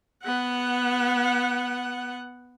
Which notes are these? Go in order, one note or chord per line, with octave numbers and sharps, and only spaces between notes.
B3 F#5